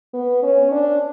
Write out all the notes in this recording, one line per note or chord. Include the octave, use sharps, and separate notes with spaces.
B3
C#4
D4